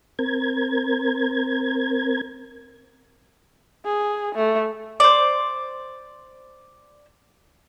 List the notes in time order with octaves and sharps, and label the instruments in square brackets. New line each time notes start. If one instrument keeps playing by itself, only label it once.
[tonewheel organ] C4 A#4 G#6
[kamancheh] G#4
A3
[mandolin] C5 D5